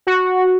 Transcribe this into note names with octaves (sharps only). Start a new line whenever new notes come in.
F#4